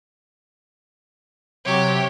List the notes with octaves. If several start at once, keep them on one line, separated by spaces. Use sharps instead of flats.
C3 F#3 G4 C#5